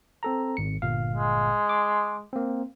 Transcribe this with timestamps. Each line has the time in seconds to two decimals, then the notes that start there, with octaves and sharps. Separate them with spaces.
0.23 C4 A4 A#5
0.57 G#1 C#7
0.82 G1 A#2 F5
1.14 G#3
1.69 D6
2.33 A#3 C4